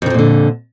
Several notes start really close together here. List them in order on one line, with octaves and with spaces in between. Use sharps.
F2 D#3 F3 A#2 D3